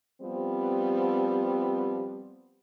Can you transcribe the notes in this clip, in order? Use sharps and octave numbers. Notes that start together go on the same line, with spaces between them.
F3 G3 B3 C4